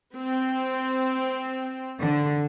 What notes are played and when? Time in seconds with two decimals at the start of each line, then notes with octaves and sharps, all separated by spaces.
0.17 C4
2.03 D3